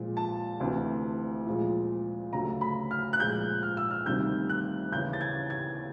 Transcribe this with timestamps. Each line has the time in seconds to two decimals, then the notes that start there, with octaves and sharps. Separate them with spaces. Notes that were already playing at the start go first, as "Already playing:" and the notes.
Already playing: A#2 F3 G#3
0.17 A5
0.60 D2 C3 E3
1.46 A#2 F3 G#3
2.33 D2 C#3 F#3 A3 A#5
2.61 B5
2.91 F6
3.13 F#6
3.19 A#2 F3 G#3 G6
3.63 F6
3.77 E6
3.91 F6
4.06 D2 C3 D#3 G3 G6
4.49 F#6
4.92 D#2 C#3 E3 G6
5.13 A6
5.21 G#6
5.50 G#6